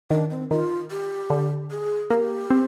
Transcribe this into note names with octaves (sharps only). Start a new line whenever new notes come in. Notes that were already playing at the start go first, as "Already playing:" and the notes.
D#3 D4
C4
D#3 F4
G4
D3
G#4
A#3 G4 G#4
C4